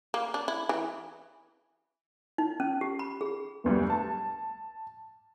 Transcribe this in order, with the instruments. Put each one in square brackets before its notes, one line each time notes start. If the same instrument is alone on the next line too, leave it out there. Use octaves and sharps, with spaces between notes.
[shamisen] A#3
D4
E4
E3
[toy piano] D#4
C#4
G4
B5
G#4
[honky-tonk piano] F1 D2 G3
A5